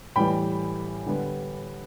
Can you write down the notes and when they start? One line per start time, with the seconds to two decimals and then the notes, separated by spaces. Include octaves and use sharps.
0.16 A2 E3 G3 G5 B5
1.06 D3 G3 B3